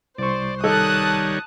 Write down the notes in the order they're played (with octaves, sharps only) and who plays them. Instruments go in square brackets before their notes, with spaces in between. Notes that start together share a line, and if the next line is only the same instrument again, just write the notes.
[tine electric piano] C2 C#6 [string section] C5 [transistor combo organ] D5
[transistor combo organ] D#3 G3 C#5 [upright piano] A4 [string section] A5 D#6 F#6